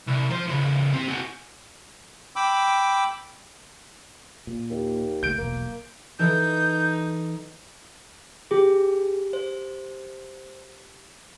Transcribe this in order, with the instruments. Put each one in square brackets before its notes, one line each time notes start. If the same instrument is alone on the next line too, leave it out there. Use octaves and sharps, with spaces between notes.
[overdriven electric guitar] C2
F3 C5
A2 C#3
C4 G4
F#4 G#4
[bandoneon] G5 B5 D6 E6
[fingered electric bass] A#2
[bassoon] D#2
[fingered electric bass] C#2 G3 A3 [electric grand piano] G6 D7
[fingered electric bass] E1 B1 [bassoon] A#3
[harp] E3 A4 [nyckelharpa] D#4 [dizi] G6
[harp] G4 [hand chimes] G#4
[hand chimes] C5